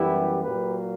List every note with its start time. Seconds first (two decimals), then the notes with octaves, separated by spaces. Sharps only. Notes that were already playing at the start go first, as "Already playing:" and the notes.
Already playing: F#2 E3 G3 B3 E4 G4
0.43 A#2 F#3 A#3 G4 B4